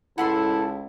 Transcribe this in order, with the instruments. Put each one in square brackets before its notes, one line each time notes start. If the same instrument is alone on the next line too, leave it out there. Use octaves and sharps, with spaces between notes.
[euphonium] C#2 [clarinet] E4 [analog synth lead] A4 [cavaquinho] F#5 B5 C6